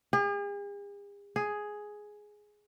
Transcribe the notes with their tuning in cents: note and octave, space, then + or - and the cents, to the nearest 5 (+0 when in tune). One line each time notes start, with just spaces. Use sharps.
G#4 -45
G#4 +5